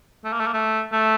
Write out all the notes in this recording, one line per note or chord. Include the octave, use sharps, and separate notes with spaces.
A3
A#3
A3
A#3
A3
A3